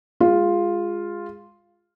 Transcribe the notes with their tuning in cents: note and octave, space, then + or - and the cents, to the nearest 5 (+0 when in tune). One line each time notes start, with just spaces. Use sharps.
G#3 -20 F4 +0